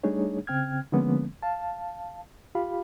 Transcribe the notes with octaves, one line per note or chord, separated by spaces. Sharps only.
G3 A3 D4 D#4 G#4 C#5
C#3 C4 G5 F6 G#6
D3 F3 G#3 A#3 B3 C#4
F5 A5
F4 G4 F5 B5